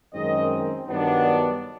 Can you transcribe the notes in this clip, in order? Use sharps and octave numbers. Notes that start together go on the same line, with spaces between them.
F#2 D#3 G#3 C4 D#5
G2 D#3 F#3 B3 D4
D5